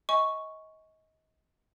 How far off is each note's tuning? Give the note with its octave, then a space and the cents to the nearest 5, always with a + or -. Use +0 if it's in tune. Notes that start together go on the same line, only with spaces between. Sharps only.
D#5 +25 G#5 +0 C#6 +0